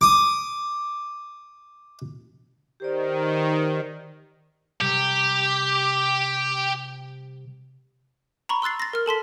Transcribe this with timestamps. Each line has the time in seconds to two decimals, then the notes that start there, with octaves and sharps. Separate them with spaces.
0.01 D6 D#6
2.80 D#3 G4 C5 D5
4.81 C3 G3 G4
8.49 A#5 B5 C#6
8.62 C6 E6 F#6 A6 C7
8.80 A6 A#6
8.93 A#4 F6
9.06 A4 A5 C6 B6